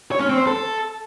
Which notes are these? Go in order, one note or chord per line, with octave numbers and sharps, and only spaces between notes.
C#5
C#4
C4
C5
A4